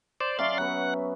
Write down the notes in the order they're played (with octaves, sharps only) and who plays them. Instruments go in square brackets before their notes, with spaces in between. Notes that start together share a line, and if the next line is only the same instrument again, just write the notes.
[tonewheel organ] C5 D5
[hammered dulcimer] F#3 C#4 E5 [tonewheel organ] D5 F5 C6
[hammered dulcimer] F#3 B3 [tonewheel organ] F#5